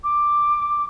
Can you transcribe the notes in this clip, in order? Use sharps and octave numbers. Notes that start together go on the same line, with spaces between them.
D6